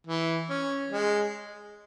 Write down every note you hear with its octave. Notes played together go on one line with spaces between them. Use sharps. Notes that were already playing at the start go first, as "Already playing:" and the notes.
E3
C#4
G#3